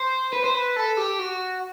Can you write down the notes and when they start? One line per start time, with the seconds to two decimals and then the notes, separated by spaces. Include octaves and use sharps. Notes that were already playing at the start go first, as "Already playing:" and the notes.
Already playing: C5
0.33 B4
0.44 C5
0.54 B4
0.76 A4
0.97 G4
1.19 F#4